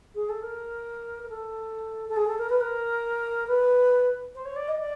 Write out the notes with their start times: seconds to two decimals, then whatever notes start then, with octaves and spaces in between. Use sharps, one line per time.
0.15 G#4
0.29 A4
0.42 A#4
1.23 A#4
1.29 A4
2.09 A4
2.16 G#4
2.28 A4
2.38 A#4
2.49 B4
2.60 A#4
3.47 B4
4.35 C5
4.45 C#5
4.56 D5
4.68 D#5
4.79 D5